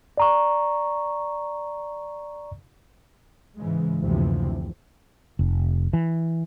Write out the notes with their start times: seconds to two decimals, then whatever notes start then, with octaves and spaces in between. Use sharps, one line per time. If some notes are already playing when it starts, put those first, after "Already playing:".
0.17 D5 A#5 C#6
3.57 G#2 C#3 E3 G#3
3.99 F#1 D2 C3 E3 F3
5.39 F1
5.93 E3